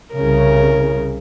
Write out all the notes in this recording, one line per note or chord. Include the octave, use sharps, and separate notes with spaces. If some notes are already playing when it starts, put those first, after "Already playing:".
C2 C#3 A#4